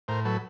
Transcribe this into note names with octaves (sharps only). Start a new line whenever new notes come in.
A2 A#4 C5
F#3 A4 B4